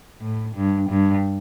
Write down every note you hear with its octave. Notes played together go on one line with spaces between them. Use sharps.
A2
G2
G2